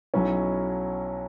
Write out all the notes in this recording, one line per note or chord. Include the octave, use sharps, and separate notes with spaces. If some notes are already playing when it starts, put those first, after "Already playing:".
B1 B2 F#3 C#4 E4